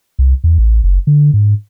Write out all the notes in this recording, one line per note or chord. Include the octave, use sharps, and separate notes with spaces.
C2
E2
A1
F#1
D3
G#2